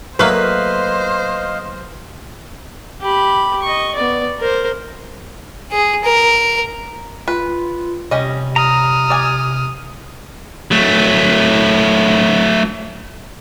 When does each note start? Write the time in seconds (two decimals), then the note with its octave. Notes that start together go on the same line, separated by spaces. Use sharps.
0.19 F#3 A3 A#3 B4 C5 D#5 F5
3.01 G4 B5
3.63 D#5 C#6
3.96 B3 D5
4.40 A#4 C5
5.72 G#4
6.04 A#4
7.28 F4 B4
8.11 C3 G3 C#4 D#5
8.56 A#5 D#6 F6
9.10 D5 G#5
10.71 F#3 A3